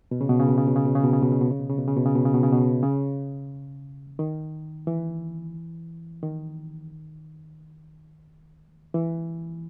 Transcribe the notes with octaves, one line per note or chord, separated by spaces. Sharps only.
B2
C#3
B2
C#3
B2
C#3
B2
C#3
B2
C#3
B2
C#3
B2
C#3
B2
C#3
B2
C#3
B2
C#3
B2
C#3
B2
C#3
B2
C#3
B2
C#3
D#3
E3
D#3
E3